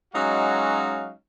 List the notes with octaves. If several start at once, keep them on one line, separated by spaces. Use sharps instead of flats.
F#3 G#3 C#4 D#4 F#4 F5